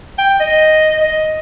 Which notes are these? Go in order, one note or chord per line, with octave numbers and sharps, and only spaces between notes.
G5
D#5
D#5